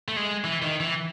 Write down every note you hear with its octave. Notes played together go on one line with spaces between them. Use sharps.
A3
G#3
E3
D#3
E3